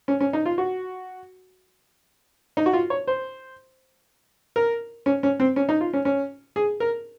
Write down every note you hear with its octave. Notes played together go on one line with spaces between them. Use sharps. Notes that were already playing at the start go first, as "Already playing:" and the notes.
C#4
C#4
D#4
F4
F#4
D#4
F#4
F4
C#5
C5
A#4
C#4
C#4
C4
C#4
D#4
F4
C#4
C#4
G#4
A#4